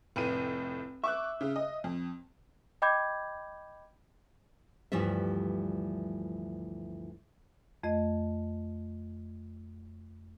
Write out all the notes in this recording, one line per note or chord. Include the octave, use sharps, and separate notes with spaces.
F1 A2 D#7
E5 C#6 D6 F#6
C#3
D#5
F2
D#5 G5 B5 D6 G6 G#6
D2 G2 E3 F3 G3 E5
F2 A3 D#5